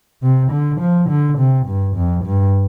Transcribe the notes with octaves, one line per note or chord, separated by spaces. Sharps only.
C3
D3
F3
D3
C3
G2
F2
G2